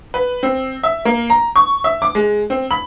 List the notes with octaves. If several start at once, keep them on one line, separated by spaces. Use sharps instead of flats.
B4
C4
E5
A#3
A#5
C#6
E5
D6
G#3
C4
B5